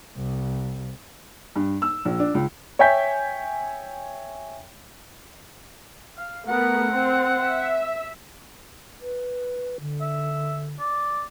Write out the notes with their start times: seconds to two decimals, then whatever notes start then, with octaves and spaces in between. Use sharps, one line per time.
0.17 C2
1.56 G2
1.82 E6
2.05 A#1
2.20 D4
2.34 C#2
2.79 C#5 E5 G5 G#5 G6 B6
6.18 F5
6.48 A3 B3 A#4 F#5
6.91 C4
7.41 E5
9.01 B4
9.81 D3
10.01 E5
10.80 D5